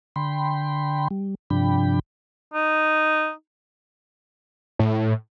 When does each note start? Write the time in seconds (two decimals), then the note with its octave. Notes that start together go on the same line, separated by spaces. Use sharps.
0.16 D3 G5 B5 C6
1.11 G3
1.50 G2 C3 F3 D4 G5 B5
2.54 D#4
4.79 A2